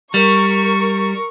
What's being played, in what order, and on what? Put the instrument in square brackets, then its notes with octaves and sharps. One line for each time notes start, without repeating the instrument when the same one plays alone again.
[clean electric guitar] G3 [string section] A#4 C#6